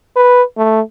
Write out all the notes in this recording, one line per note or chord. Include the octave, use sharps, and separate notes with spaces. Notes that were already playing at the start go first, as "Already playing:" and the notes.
B4
A3